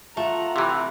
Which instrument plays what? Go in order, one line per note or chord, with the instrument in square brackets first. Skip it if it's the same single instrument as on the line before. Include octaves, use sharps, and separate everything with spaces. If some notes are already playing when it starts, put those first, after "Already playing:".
[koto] A3 [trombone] F4 [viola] F#5 A#5
[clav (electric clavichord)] C3 E3 [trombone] G4